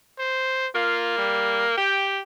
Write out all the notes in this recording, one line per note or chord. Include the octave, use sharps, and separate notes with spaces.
C5
A#3 F4
G3
G4 G5